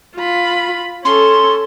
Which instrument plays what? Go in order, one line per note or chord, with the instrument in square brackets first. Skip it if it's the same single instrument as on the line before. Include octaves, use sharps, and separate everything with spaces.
[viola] F4 B5
[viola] C#4 A4 [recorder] C6